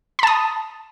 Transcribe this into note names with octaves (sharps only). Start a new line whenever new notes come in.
A5 B5 D#6